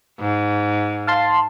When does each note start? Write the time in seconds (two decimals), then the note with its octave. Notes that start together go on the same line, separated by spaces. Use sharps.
0.20 G#2
1.07 F5 A5 C6